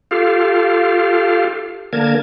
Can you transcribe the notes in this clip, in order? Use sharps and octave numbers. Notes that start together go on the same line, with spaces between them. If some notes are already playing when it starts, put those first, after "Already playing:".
F4 G4 A4 F5
D3 A#3 A#4 A5 G#6